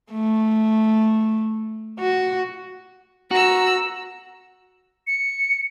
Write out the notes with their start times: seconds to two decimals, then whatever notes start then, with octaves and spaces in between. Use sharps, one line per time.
0.11 A3
2.00 F#4
3.31 F#4 A#5 E6
5.07 C#7